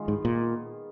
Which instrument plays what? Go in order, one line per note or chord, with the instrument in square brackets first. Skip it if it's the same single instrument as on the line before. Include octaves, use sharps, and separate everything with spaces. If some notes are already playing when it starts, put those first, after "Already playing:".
Already playing: [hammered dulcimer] D#3 G#3 B3 F4
[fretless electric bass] G#2
A#2